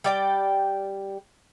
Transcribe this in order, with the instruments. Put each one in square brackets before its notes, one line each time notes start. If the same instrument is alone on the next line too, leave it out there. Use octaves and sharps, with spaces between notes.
[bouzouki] G3 D5 G5